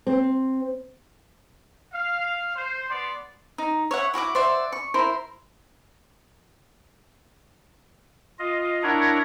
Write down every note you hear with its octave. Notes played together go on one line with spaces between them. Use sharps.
C4
F5
C5
B3 D5 C6
D#4
C#5 E5 F#5
E4 F#4 F#5 D6
C5 D5 E5 F#5
C#6
E4 A#4 C5 C6
F4 D#5
D4 E4 A#4 C#5 F#5 A#5